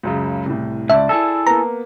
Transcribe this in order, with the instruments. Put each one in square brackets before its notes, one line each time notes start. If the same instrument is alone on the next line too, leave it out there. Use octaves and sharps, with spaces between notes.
[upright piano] C#2 F#2 C#3
C2 A2
[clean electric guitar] C#2 [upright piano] D5 A5 [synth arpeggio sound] E5
[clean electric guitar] E4 G#4 A4
[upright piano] A#3 B3 [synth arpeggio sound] A#5